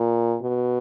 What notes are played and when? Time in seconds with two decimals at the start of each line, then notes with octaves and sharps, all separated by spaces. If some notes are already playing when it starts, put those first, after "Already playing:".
Already playing: A#2
0.41 B2